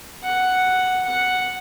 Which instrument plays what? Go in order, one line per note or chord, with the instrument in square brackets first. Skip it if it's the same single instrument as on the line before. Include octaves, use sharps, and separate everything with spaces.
[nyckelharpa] F#5
F#5